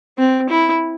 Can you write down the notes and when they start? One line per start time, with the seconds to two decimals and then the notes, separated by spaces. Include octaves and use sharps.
0.18 C4
0.50 E4